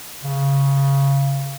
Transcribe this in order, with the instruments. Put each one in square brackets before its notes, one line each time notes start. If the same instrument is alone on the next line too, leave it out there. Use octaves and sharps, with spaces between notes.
[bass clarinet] C#3